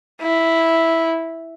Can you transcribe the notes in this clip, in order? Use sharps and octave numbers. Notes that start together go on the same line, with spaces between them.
E4